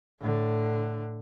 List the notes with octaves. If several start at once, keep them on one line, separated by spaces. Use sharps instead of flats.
A2 D3